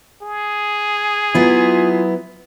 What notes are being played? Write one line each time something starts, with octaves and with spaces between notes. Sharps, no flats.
G#4
F#3 B3 E4 F4